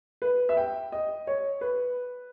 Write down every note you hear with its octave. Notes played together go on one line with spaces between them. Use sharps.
B4
E5
G5
D#5
C#5
B4